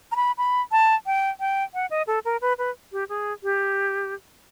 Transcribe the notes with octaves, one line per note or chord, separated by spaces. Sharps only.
A#5
B5
B5
A5
G5
G5
F#5
D#5
A4
A#4
B4
B4
G4
G#4
G4